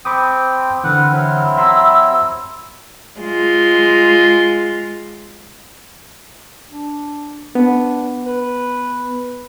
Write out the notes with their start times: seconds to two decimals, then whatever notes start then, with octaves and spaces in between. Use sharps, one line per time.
0.05 C4 G5 B5 D6 D#6
0.84 D3 E3 C4 B4 F#5 F6
1.12 F#3 C4 E4
1.57 E5 A#5 C6 E6
3.20 G#3 F4
6.70 D4
7.55 B3 D4
8.26 B4